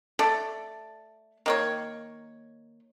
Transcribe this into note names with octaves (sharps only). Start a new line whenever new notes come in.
A3 A4 D5
D#3 A#3 C#5